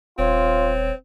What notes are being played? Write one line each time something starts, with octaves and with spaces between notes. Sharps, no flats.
D#1 C4 F4 C#5